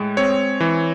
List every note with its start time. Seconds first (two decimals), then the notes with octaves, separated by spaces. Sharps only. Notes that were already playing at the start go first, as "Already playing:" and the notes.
Already playing: A2 G#3
0.17 C4 C#5
0.60 E3